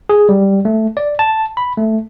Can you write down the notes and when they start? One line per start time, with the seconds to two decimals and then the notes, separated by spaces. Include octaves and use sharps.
0.09 G#4
0.29 G3
0.65 A3
0.97 D5
1.19 A5
1.57 B5
1.77 A3